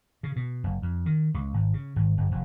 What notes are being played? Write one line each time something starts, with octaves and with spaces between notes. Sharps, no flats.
C#3
B2
F#1
F2
D#3
C#2
G#1
C#3
G#1
G1
F1